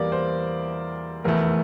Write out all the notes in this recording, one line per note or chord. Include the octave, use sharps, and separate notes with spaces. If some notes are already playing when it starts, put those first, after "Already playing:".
Already playing: E2 E3 G3 A#3 A#4 D5
C5
F1 E2 E3 A3 A#4